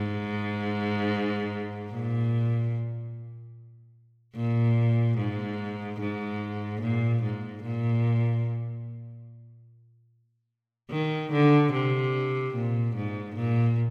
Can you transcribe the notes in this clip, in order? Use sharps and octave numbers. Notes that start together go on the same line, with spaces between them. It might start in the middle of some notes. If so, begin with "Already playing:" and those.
Already playing: G#2
A#2
A#2
G#2
G#2
A#2
G#2
A#2
D#3
D3
C3
A#2
G#2
A#2